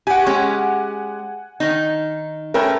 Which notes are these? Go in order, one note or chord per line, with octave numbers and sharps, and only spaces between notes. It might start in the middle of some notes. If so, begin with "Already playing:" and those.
G4 F#5 G#5
G#3 C#4 G4
D#3 D#4
A3 C#4 A#4 B4 G5